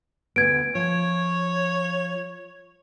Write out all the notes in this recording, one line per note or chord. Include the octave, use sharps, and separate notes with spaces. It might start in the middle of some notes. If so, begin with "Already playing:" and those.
D2 G#2 B3 G#6 D7
F3 C#5